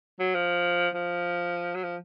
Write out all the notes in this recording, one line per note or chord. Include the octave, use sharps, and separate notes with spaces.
F#3
F3
F3
F#3
F3